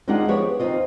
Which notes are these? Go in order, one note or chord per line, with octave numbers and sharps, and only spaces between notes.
D#2 G#3 D4 D#4 F4 F#5
F3 B3 G4 G#4 C#5 D5
D#2 C3 C4 F4 D#5